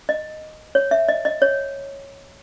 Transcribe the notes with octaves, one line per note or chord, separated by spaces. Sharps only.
D#5
C#5
E5
D#5
D#5
C#5